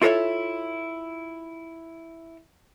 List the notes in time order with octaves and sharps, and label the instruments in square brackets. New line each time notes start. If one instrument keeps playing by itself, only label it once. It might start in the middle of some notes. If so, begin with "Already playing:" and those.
[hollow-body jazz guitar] E4 F4 A4 A#4 C#5 E5